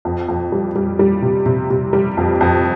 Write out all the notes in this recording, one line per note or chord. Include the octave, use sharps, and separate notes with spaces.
F2
F2
G3
G3
G3
C3
C3
C3
G3
F2
F2